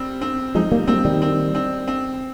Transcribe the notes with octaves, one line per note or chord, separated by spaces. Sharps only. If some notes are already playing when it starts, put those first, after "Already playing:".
Already playing: G3 C4
C4
F3 G#3 D#4
G3 A#3
G3 A#3 C4
D#3 G3
C4
C4
C4